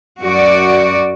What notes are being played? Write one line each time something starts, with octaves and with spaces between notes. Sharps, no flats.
F#2 F#4 D5